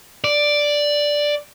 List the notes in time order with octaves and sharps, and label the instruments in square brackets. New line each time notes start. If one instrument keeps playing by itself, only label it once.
[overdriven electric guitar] D5